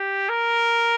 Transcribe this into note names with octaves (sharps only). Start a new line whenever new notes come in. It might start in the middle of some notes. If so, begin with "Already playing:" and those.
Already playing: G4
A#4